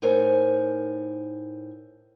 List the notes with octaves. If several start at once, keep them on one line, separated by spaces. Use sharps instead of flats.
A2 D#4 A#4 C5 C#5 G#5